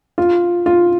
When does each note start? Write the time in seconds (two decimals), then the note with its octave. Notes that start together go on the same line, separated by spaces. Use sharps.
0.18 F4
0.66 F4